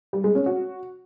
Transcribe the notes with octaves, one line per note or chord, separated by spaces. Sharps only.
G3
G#3
C#4
F#4